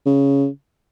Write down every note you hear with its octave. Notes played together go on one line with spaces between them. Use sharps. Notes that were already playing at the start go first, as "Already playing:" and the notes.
C#3